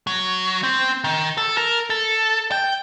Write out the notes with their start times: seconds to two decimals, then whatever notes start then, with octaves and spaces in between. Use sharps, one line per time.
0.07 F#3
0.64 C4
1.04 D#3
1.37 A4
1.57 A#4
1.90 A4
2.52 G5